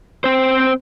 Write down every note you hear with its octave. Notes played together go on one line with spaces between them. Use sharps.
C4 C5